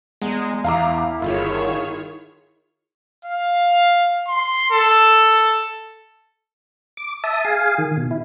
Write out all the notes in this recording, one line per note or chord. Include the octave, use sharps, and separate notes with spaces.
E2 G#3
E2 E4 F5 A#5 D6
G1 D#3 F4 G#4 C#5
F5
C6
A4
D6
E5 A5 D#6
G#4 F5 G#5
D#3
B2
E4